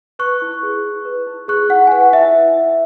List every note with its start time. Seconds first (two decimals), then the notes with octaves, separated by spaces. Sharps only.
0.19 B4 C#6 F#6
0.42 E4
0.63 G#4
0.84 E4
1.05 B4
1.27 E4
1.48 G#4 C#6 F#6
1.69 E4 F#5
1.87 G#5
1.92 B4 F#5
2.13 E4 E5